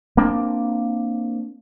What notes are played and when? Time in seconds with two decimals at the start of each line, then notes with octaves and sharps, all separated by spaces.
0.17 A#3 C4 D4